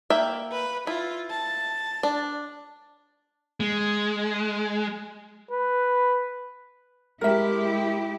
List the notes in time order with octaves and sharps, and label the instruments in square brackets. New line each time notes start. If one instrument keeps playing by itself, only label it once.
[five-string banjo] A#3 E5 G5
[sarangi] B4
[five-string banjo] E4 [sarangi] F4
[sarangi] A5
[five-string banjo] D4
[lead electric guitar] G#3
[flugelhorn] B4
[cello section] G#3 E4 G4 [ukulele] A#4 E5